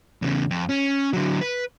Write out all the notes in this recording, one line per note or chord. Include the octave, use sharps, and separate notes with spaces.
E2 C#3
F2
C#4
D3 F#3
B4